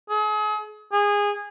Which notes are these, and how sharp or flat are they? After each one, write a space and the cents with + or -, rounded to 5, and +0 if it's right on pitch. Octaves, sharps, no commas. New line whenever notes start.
G#4 +40
G#4 -20